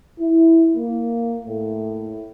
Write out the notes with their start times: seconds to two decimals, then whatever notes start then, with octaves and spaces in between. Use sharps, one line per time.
0.20 E4
0.77 A#3
1.47 A2